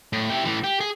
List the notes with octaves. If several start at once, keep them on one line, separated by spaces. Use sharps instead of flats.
A2
E4 G4
A2 E3
G4
G#4